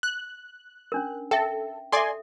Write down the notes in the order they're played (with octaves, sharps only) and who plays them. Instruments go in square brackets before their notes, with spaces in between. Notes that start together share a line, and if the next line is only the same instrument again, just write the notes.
[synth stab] F#6
[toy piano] C#4 D4 A#4
[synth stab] A4 [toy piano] E5 G5
[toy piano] A4 E5 [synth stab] D5 G#5 C6